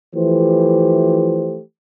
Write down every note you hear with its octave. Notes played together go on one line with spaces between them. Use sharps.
E3 F3 A3 G4 C5